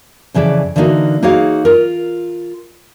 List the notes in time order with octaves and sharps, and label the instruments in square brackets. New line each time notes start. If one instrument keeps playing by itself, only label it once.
[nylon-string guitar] F2 C#3 E3 D5
D3 E3 G3 A#3 D#4 F#4
A#3 D#4 F#4 G#4 C#5 F5
F4 A#4